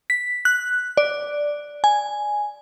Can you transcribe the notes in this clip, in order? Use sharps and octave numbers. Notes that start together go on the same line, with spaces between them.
B6
F#6
D5
G#5